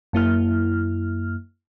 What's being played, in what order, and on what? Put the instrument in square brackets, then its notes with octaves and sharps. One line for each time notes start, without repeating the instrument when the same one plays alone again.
[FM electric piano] F#2 A#3 E4 F6